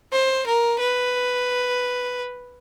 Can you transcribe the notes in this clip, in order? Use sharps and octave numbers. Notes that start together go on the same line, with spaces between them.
C5
A#4
B4